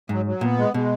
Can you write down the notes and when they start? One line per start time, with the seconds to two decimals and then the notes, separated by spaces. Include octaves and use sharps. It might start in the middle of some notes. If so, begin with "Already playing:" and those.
0.09 G#2 F#3
0.25 F#3
0.41 A#2 B3
0.58 G#3
0.74 B2 G#3